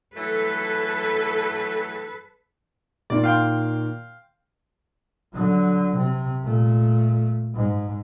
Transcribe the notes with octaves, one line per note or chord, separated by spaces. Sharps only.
E3 F#3 A3 A4 B4
A#2 D#3 A#3 D5
F5 G5 C6
D3 F#3
C3
A#2 A3
G#2